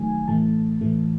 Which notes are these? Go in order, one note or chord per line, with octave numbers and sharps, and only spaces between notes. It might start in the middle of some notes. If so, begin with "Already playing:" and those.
Already playing: D#3 F#3 A3 G#5
A2 E3 A3 A5
A2 E3 A3